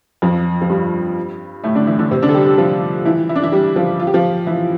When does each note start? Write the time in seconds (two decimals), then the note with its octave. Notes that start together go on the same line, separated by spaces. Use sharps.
0.22 F2 F3
0.62 F3
0.69 G2 G3
1.64 A2 A3
1.75 D3 D4
1.87 E3 E4
1.99 D3 D4
2.11 C3 C4
2.22 D3 D4
2.29 A4
2.34 G3 G4
2.46 G3 G4
2.58 F3 F4
3.05 E3 E4
3.29 E4
3.36 D4
3.43 E3 E4
3.52 G3 G4
3.76 F3 F4
4.00 F4
4.07 G4
4.14 F3 F4
4.47 E3 E4